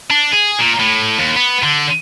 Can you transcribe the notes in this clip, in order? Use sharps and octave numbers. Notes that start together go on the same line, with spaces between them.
D4
G#4
A#2
A2
D#2
B3
D3